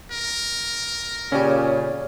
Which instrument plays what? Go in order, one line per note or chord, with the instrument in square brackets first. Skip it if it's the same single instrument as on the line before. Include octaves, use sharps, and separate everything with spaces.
[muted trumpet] A#4
[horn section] A#2 C#3 [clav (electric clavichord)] C#4 G4 [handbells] C#5 D5 F6